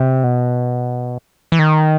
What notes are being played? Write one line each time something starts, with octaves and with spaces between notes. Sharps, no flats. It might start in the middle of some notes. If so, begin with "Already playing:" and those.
Already playing: C3
B2
E3
D#3